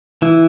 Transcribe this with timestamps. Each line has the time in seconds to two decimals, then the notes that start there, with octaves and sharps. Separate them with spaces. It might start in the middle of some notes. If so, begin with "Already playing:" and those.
0.22 E3 E4